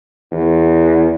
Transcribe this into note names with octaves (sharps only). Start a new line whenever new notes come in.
E2